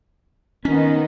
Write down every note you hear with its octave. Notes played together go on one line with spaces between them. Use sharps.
D#3 B3 C#4 D#4